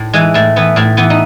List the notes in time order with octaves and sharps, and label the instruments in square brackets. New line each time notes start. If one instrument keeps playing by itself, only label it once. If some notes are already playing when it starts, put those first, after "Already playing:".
Already playing: [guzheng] A2
E3 G#3
A2 A3
E3 B3
A2 A3
E3 B3
D#4